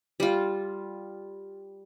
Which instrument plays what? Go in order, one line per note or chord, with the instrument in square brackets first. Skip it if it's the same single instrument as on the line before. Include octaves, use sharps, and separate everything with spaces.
[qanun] G3 F4